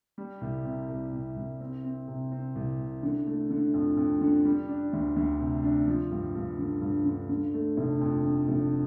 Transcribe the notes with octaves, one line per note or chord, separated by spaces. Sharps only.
G3
C2
C3
C2
C3
C2
C4
C4
C3
C4
C2
C3
D3
A3
D3
F2
F2
D3
G3
D4
D2
D2
C3
D4
F3
G2
G2
D3
G2
D3
D3
A3
F1
F2
D3
F1